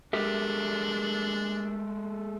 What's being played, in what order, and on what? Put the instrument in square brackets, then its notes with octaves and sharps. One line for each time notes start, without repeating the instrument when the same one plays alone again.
[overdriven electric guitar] G#3 A3 [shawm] D4 [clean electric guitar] G4 A#4 E5